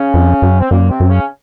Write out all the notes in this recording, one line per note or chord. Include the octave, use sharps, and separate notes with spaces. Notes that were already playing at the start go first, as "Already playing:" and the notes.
Already playing: C#3 C#4
F2
F#2
C4
F#2 A#2 A#3
C3 C4
F#2
C#3 C#4